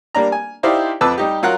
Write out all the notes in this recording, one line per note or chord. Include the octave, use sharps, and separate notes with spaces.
G3 A#3 D4 A#5
G#5
D#4 E4 G4 C5 D5 F5
F2 B4 A5 D6 E6
G3 D#4 G4
F#3 F4 A#4 F#5 F#6